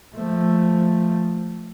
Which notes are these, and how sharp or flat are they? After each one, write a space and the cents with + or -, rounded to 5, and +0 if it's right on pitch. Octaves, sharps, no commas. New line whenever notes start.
F3 +0 A3 +0